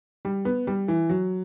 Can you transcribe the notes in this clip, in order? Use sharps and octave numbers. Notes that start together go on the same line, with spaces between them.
G3
B3
G3
E3
F#3